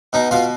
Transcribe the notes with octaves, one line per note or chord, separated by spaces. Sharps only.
B2 D#4
B2 F4